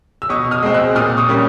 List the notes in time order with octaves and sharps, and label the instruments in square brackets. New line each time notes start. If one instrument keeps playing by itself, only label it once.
[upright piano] E6
B2 C#6 D#6
D#6 F6
G#3 C4
E6 F#6
A#2 D#6 F6
C#6 D#6
G3 A#3 C#4